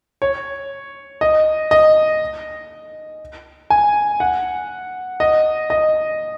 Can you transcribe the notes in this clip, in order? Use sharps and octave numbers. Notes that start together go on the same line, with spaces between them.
C#5
D#5
D#5
G#5
F#5
D#5
D#5